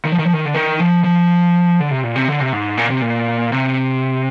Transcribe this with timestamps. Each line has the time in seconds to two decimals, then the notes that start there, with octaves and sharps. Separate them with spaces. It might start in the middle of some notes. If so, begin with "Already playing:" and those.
0.05 D#3
0.12 F3
0.19 D#3
0.26 F3
0.33 D#3
0.45 D3
0.54 D#3
0.80 F3
1.04 F3
1.80 D3
1.91 C3
2.03 A#2
2.16 C3
2.28 D3
2.40 C3
2.52 G#2
2.77 A#2
2.90 C3
3.02 A#2
3.52 C3